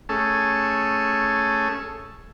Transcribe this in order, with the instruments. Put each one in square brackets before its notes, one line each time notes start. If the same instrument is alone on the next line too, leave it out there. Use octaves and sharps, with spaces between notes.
[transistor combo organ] A3 C#4 G#4 A4